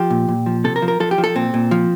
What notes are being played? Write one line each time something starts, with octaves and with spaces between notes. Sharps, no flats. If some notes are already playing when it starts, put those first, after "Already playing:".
Already playing: F3 G4
A#2
A#2
F3
C3 A4
A#4
F3
A#4
F3 A4
G4
F3
A4
A#2 C4
A#2
F3